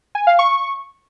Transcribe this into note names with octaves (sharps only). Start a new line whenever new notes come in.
G#5
F5
C#6